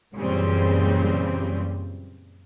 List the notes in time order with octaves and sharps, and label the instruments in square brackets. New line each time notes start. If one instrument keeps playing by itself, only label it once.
[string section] F#2 A#2 C#3 E3 G3 C4